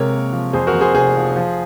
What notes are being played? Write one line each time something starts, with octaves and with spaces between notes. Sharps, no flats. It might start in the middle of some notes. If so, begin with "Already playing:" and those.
Already playing: C3 G#3 A#3 A#4 C#5
A#3
F3
F2 G#4 C5
F#4 A#4
F2
G#4 C5
F1 G#4 C5
F3
F3